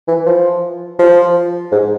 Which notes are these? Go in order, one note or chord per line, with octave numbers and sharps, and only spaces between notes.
E3
F3
F3
G#2